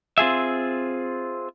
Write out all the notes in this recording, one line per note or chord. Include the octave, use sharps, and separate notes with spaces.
C4 F4 G#4 E5